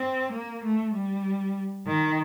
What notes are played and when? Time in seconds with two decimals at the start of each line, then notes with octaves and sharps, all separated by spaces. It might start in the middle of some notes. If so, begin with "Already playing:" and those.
Already playing: C4
0.32 A#3
0.64 A3
0.94 G3
1.87 D#3